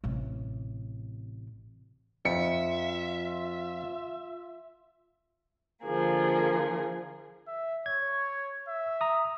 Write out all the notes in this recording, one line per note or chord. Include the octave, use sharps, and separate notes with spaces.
A1 C3
F2 F4 E5 C#7
D3 F3 A#3 G#4
E5
C#5 G#6
E5
A#5 D#6